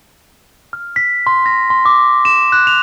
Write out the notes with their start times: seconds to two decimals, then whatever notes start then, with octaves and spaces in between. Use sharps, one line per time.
0.73 F6
0.96 B6
1.27 C6
1.46 A#6
1.70 C6
1.85 D6
2.25 E7
2.52 F#6
2.67 F7